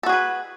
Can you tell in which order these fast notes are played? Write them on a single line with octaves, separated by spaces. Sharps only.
A4 F#4 G#4 B4